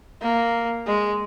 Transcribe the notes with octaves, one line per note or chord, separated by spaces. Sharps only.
A#3
G#3